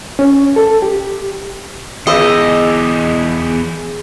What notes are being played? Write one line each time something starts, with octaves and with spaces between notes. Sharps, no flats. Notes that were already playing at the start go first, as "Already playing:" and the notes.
C#4
A4
G4
E2 G4 G#4 D#5 E6